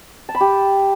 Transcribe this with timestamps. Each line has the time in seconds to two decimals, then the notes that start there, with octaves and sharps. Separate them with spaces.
0.29 A5
0.35 B5
0.40 G4